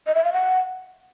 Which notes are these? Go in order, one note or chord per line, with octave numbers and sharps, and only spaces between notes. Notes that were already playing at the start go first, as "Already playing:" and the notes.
D#5
E5
F5
F#5